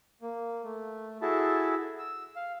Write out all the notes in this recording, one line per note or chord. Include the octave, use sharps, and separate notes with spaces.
A#3
A3
E4 F#4 G#4 A4 E5 A5
E6
F5